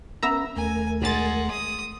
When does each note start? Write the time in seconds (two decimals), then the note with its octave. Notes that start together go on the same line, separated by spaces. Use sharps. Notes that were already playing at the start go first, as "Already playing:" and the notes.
0.23 B3 C#4 A#4 E5 A#5
0.56 D#2 A3 A#4 G#5
1.02 B1 G#3 F#5 A6
1.51 D#6